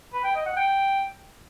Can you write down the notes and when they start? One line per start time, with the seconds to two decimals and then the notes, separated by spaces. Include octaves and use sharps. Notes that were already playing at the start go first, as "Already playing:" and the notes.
0.13 B4
0.24 G5
0.35 D#5
0.46 F#5
0.57 G5